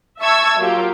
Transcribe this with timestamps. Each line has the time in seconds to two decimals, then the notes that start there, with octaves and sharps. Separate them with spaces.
0.20 E5 A5 C#6 E6 G#6
0.58 F#3 A#3 F4 G4